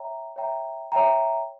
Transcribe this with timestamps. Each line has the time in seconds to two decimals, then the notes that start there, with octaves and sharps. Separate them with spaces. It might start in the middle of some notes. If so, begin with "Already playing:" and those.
Already playing: C#5 E5 G5 A#5
0.36 C#5 E5 G5 A#5
0.92 C#5 E5 G5 A#5